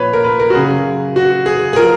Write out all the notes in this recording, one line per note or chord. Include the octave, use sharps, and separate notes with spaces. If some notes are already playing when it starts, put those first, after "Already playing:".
Already playing: A#2 F3 B4 C#5
A#4
B4
A#4
F#4
F#2 C#3 F#3 G#4
F#4
G#4
G#4
F3 A#4